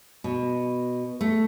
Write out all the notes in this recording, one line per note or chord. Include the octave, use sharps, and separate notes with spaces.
B2
A3